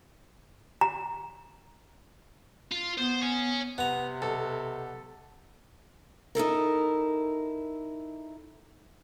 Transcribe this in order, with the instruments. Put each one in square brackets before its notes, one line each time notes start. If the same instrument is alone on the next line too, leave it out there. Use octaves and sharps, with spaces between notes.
[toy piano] A#5
[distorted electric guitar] F4
[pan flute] B3 [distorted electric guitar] C5
[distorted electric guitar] C#5 G#5
[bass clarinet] C3 [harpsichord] B3 A#5 [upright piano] F#5
[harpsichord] B1 [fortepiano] A4
[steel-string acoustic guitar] D#4 E4 A4 A#4